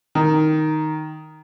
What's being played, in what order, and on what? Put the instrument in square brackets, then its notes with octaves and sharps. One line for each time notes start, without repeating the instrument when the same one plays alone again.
[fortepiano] D#3